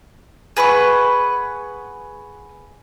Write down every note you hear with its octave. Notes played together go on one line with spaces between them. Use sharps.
G#4 B4 F#5 C#6